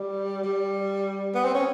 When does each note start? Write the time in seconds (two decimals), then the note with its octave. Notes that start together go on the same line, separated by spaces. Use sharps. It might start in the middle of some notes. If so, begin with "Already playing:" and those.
Already playing: G3
0.44 G3
1.35 B3
1.45 C4
1.54 C#4